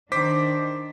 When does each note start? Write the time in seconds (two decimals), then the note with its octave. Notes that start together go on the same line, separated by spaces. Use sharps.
0.12 D#3 D4 C5 D6 B6